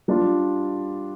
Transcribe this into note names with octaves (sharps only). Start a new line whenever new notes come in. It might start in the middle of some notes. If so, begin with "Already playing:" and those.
G3 D4 F4